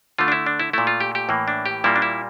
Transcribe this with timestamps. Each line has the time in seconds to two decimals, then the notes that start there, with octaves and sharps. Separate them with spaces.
0.18 D3 A3 F4
0.28 D4
0.32 E4
0.46 D4
0.60 E4
0.73 A#2 A3 E4
0.87 F4
1.01 G4
1.15 G4
1.29 A2 E3 A#3
1.48 D4
1.66 G4
1.84 A#2 G3 A#3 E4
1.96 D4
2.02 E4